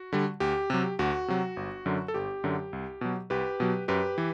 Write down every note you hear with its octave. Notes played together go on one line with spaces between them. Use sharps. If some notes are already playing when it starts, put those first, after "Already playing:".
Already playing: F#4
D3 G3
D2 G4
C3 F#3
D2 F#4
C3 F#3
G1
F#2 D3 F#3
A4
G1 G4
F#2 D3 F#3
C2
B2 F#3
C2 G4 B4
B2 F#3
F#2 G4 B4
E3